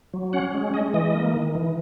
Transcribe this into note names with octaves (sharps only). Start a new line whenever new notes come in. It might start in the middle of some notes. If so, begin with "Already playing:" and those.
F#3
C#4 F#5
G#3
G#3 D#5
E3 D#5
A#3
D#3
E3